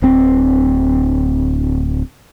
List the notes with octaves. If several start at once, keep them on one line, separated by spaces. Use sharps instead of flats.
D1 C4